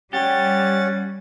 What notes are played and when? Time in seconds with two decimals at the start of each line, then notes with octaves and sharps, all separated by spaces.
0.13 G3 C#4 G4 F#5 A6